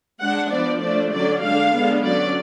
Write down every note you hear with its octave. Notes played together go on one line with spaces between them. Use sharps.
G#3 D4 F#5
F3 B3 D4 D5
F3 A3 D4 D5
D3 F#3 C#4 D5
D3 G#3 D4 F5
D3 G#3 B3 D4
D3 F#3 C#4 D5